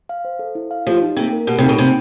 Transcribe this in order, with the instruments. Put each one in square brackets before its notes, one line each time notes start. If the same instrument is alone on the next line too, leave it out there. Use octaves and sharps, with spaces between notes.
[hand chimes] F5
C5
A4
E4
F5
[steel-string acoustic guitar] F3 [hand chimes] G4
[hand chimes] D#4
[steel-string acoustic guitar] C3 [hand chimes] A#3
[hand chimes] A#4
[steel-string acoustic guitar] B2 [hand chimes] G4
[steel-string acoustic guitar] C3 [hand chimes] D#4
[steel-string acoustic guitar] B2
[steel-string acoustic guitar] C3 [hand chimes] A#3